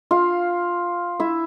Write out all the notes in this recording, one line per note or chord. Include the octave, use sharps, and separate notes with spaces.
F4 F5
E4 E5